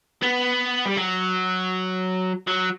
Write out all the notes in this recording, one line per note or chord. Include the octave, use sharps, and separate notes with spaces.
B3
G3
F#3
F#3